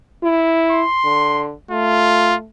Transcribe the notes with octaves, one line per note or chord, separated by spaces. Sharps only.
E4
C6
D3
A3 F4